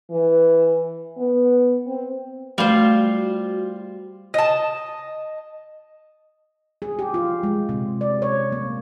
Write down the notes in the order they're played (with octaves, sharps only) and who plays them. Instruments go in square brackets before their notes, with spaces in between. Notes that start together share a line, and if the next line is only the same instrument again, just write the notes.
[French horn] E3
B3
C4
[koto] G3 C5 [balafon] A3 [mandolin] F4 [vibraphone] F#4
[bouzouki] D#5 A5
[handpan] G#4
G4
F4
G#3
C3
D5
C#5
A#3